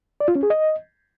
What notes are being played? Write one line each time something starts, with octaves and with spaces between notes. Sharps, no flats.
D5
F4
C#4
G#4
D#5